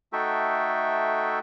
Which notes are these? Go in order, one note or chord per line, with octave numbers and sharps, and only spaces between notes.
A3 D#4 F#4 A4 E5 G5